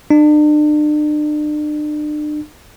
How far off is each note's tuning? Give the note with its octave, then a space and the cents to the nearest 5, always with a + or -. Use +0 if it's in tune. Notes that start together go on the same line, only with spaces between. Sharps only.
D4 +40